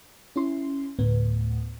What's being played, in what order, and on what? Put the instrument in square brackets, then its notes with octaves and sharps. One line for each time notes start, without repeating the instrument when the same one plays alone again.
[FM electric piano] C#4 E4 C6
D2 A2 B3